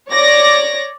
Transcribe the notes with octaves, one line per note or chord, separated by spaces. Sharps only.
C#5 D5 A#6